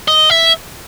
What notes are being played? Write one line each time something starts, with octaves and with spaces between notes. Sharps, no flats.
D#5
E5